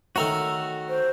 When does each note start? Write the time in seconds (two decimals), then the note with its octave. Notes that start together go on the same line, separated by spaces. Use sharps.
0.16 D#3 A3 F#4 C#5 A#5 E6
0.89 C5